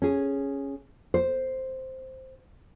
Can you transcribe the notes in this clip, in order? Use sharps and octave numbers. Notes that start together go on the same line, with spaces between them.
C#4 G#4
C5